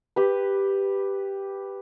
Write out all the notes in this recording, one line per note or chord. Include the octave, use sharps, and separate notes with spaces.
G4 B4